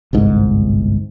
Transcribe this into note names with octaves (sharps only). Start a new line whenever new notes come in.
G1 C2 G#2